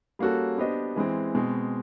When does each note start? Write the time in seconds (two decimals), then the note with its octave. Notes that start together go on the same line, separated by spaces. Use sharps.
0.19 G3 A#3 C#4 F#4 A4
0.58 B3 D4 G4 C5 D#5
0.96 E3 G#3 C4
1.35 B2 G#3 C4